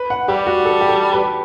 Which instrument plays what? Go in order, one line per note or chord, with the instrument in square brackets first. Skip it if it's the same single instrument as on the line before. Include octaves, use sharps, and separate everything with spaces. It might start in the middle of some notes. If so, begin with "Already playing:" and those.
Already playing: [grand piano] B4
F#5
[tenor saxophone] G3 [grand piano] G4
[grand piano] F#4
A4
G4
A4
B4